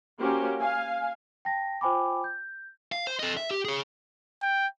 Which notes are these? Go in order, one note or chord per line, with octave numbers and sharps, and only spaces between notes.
A#3 C#4 F#4 G4 C5
F5 G#5
G5 A5 A#6
F4 C5 G5 G#5 B5 D6
G6
F5
C5
A4 D#5
E5
G4
G#4 C#5
G5